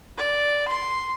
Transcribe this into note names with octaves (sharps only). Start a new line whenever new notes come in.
D5
C6